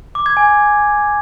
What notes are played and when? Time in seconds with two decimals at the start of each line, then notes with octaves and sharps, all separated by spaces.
0.15 D6
0.26 G#6
0.37 G#5